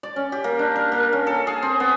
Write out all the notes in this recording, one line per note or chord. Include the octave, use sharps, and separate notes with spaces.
D5
C#4
G4
A#3
D4
A#4
A#3
C#4
A4
G#4
C4
B3